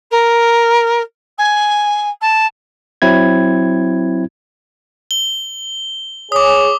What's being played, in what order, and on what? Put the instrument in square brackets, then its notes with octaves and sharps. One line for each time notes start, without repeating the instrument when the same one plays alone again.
[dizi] A#4
G#5
A5
[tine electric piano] F#3 C4 E4 G#6
[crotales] G7
[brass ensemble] G#4 C#5 [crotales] D6 D#6